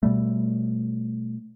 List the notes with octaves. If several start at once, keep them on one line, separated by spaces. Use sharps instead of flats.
B2 G3 A3